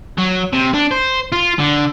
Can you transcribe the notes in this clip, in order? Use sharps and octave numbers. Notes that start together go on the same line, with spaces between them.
F#3
C3
D4
C5
F4
D3